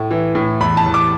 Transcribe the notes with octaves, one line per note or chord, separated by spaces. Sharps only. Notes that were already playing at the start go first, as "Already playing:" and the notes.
Already playing: A2 A3
E3
A2
E2 B5
A5
E2
D6